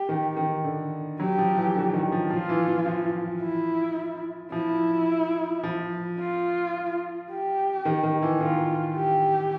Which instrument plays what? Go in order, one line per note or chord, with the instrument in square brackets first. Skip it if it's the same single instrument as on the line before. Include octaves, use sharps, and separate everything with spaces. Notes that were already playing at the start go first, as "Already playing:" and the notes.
Already playing: [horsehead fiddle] G4
[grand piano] D#3
D#3
D3
[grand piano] F#3 [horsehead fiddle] G4
[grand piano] F3
E3
D3
D#3
F3
[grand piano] F3 [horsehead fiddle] F4
[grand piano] E3
E3
F3
[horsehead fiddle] E4
[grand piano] F3 [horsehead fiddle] E4
[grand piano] F3
[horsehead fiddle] F4
G4
[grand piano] D#3
D#3
E3
[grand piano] D#3 [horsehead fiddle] F4
[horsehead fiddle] G4